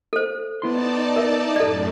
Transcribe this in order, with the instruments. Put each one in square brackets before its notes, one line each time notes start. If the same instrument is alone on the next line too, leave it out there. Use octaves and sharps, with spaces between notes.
[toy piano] A4 C5
[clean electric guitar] B3 E4 C6 [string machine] D#4 D5 A5
[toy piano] A#4 E5
[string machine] F#2 A2 [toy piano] A4 D5